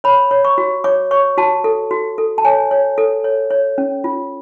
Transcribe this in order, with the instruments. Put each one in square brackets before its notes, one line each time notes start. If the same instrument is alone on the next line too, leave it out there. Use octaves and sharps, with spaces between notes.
[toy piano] C#5 B5
C#5
C#6
F#4
C#5 D6
C#5 C#6
F#4 A5
A4
F#4
A4
A5
C#5 G#5
C#5
A4
C#5
C#5
C#4
F4